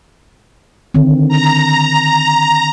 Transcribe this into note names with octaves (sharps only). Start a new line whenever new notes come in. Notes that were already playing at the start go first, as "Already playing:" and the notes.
D3 D#3 C4
A#5